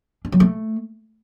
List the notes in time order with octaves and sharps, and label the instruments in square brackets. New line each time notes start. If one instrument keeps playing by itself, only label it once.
[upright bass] D4
F#3
A3